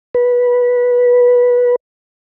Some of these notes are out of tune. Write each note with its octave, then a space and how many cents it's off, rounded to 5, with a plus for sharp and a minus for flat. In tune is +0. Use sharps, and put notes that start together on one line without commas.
B4 -15